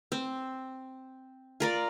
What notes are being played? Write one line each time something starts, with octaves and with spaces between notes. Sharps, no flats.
C4
F4 A#4 D5